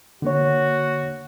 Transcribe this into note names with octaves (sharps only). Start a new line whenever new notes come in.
D3 A#3 F#4 C#5